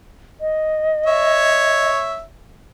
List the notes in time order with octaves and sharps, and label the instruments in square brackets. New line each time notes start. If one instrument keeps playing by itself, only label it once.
[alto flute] D#5
[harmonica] C#5 E5